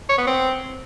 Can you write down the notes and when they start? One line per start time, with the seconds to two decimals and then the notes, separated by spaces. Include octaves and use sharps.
0.09 C#5
0.18 B3
0.27 C4